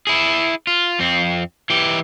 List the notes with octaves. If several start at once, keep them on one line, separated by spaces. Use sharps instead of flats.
E4 G#4
F4
F2 C4
E3 G4